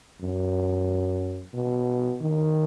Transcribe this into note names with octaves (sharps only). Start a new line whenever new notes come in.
F#2
B2
D#3